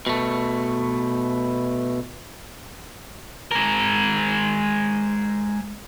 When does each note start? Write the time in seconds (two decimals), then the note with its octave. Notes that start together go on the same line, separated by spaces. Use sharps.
0.07 B2 A3
3.51 G#3 A#4